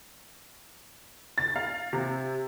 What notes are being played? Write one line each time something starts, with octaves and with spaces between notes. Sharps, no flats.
A6
F5
C3